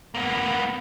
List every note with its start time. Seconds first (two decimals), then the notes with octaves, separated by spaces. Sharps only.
0.15 A#3 B3